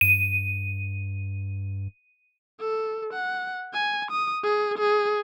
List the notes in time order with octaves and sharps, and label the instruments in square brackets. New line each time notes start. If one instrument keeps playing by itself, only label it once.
[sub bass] G2 [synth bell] D#7
[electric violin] A4
F#5
G#5
D#6
G#4
G#4